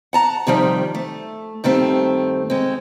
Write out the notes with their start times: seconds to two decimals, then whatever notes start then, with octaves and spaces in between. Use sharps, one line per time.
0.13 F#5 A5 A#5
0.47 C3 D#3 F3 G3
0.95 A3
1.64 G2 D#3 A3 C4
2.50 G#3 C4